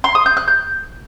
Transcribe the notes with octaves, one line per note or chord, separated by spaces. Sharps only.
C6
D#6
G6
F#6
G6